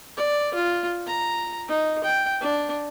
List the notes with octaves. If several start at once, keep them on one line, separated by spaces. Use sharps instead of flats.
D5
F4
A#5
D#4
G5
D4